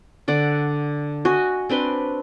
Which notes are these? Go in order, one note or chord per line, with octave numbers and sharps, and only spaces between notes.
D3 D5 F#5
F#4 D#5 G#5
C4 D4 B4 C6